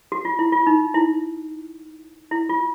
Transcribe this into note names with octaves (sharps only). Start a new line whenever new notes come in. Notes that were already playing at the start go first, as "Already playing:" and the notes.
F#4
F4
E4
F4
D#4
E4
E4
F4